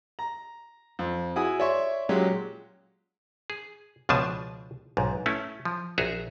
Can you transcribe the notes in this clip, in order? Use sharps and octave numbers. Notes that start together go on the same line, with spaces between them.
A#5
F2
E4 F#4 G#4 G#5 D#6
C#5 D5 E5 C6 C#6
A#2 F#3 G#3 C#4 G4
G#4
C#2 B2 F3 D4 G#5 A5
B1 G#2
A3 C#4 E4
F3
A#1 F#4 G#4 E5 A#5